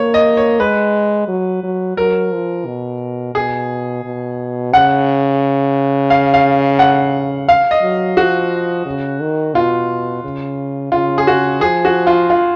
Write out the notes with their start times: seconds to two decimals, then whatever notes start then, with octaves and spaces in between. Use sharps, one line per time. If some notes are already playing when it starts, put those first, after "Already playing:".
Already playing: A#3 C#5
0.14 D#5
0.37 C#5
0.60 G#3 B4
1.28 F#3
1.64 F#3
1.97 F#3 A#4
2.33 F3
2.66 B2
3.35 B2 G#4
4.04 B2
4.73 C#3 F#5
6.10 F5
6.34 F5
6.79 F#5
7.48 F5
7.71 D#5
7.82 F#3
8.17 F3 F#4
8.86 C#3
9.20 D#3
9.55 B2 F4
10.24 C#3
10.92 C#3 F4
11.18 G#4
11.27 F#4
11.61 F3 G#4
11.85 F#4
12.07 F4
12.30 F4